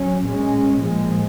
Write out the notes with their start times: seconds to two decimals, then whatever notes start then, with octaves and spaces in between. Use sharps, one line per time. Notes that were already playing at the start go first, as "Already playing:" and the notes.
Already playing: F#3 C#4
0.25 A#2 G#3 C#4
0.81 A#2 F3 G#3